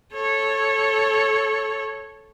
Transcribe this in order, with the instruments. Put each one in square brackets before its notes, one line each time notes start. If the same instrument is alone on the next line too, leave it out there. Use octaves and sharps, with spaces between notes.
[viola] A4 C#5